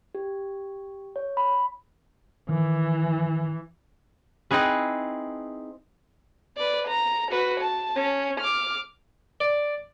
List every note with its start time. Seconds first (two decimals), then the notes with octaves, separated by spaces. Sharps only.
0.15 G4
1.16 C#5
1.37 B5
2.49 D#3 E3
4.51 C4 D#4 E4 G#4 B4
6.57 B4 D5
6.88 A#5
7.31 F#4 B4
7.60 A5
7.96 C#4
8.40 D6 F6
9.41 D5